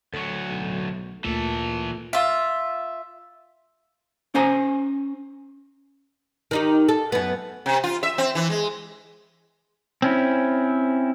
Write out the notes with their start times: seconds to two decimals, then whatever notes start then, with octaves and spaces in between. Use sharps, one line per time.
0.14 D2 F#3 A4
0.48 B1
1.24 D2 A#2 E3 A3 A4
2.13 F4 E5
4.35 C#4 C5 G#5 A#5
6.51 D#3 D#4 G4
6.89 A4
7.12 F#2 B3
7.66 C3
7.84 F4
8.03 E5
8.18 C4
8.35 E3
8.50 G#3
10.02 C4 C#4 E4